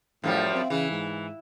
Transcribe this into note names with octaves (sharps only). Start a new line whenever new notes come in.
F#2 A2 F3 G3
C4
C#3 E3
G#2